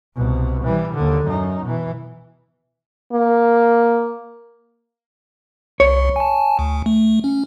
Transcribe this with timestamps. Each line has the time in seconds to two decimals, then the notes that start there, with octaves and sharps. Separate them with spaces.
0.16 C2 B2
0.64 E3 G3
0.94 D#2 D3
1.25 F#2 D#4
1.64 B2 E3
3.13 A#3
5.80 C2 C#5
6.16 G#5 A5
6.59 D2
6.86 A3
7.24 C#4